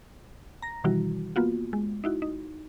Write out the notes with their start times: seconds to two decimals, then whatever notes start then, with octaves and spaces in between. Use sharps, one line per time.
0.62 A#5 A#6
0.84 B2 D#3 E3 G3 E4 F#4
1.36 A#3 B3 F4 F#4
1.73 G#3
2.04 D#4 E4 F#4
2.22 D#4